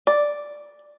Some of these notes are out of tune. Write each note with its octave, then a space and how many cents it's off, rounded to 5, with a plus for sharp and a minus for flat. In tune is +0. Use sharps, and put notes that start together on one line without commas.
D5 +0